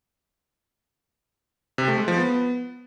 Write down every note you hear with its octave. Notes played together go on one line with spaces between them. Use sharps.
C3
A3
G#3
F3
B3